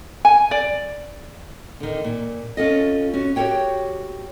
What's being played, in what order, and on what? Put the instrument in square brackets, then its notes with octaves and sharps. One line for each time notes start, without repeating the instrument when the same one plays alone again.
[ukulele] G#5
D5
[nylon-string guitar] D3 D#3
A#2
C#4 F4 A4 D#5
C#4 F#4
F#4 G4 A4 C5 C#5 G5